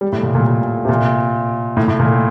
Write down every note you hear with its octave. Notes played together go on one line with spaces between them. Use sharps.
G3
A2
A#2
A#2
A#2
C3
A#2
A2
A2
A#2